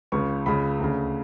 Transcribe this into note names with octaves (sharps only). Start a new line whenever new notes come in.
C#2 C#3 C#6
C#2 C#3 B5
D2 C#3